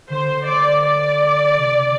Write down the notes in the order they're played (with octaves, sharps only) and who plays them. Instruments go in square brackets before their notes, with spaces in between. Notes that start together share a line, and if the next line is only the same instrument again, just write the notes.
[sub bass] D3 [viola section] C5
[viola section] D5
D5
[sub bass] C3